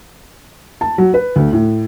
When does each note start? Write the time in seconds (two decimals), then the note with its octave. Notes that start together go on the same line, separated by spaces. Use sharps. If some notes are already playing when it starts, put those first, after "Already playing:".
0.81 A5
0.98 F#3
1.14 B4
1.36 D2
1.53 A2